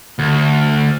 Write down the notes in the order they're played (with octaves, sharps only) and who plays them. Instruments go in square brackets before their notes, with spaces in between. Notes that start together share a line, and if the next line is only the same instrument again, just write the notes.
[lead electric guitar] D2